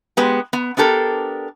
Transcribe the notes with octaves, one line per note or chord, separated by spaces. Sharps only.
G#3 B3 G4
B3
B3 D4 G4 A4 A#4